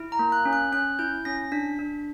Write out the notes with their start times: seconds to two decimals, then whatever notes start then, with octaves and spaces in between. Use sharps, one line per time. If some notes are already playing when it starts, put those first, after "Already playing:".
Already playing: E4
0.12 A#5
0.19 A#3
0.32 F#6
0.45 C#4
0.53 F#6
0.72 C#4 F#6
0.99 E4 G6
1.25 C#4 A#6
1.52 D4 B6
1.79 D4